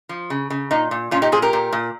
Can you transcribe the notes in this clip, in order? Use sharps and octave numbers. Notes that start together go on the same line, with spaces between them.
F3
C#3
C#3
A#2 D#4
A#2
A#2 C#4 F4
D#4 G4
A#2 G#4 C5
G4 A#4
A#2
A#2